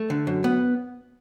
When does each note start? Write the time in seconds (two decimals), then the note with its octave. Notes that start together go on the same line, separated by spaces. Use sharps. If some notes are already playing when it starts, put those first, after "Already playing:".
Already playing: A3
0.10 D3
0.27 F#2
0.44 B3